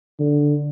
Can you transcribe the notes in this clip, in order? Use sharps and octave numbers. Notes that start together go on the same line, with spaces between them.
D3